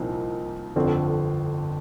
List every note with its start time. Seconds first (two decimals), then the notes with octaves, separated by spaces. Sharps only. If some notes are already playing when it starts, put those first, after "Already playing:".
Already playing: C2 A#2 F3 C4 D#4
0.76 G1 F2 D3 F3 C4